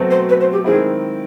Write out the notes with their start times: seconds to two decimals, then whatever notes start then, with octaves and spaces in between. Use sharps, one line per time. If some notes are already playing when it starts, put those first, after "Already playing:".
Already playing: B2 F#3 A3 C4
0.11 C5
0.29 B4
0.40 C5
0.52 G4
0.64 D#3 G#3 C4 E4 G#4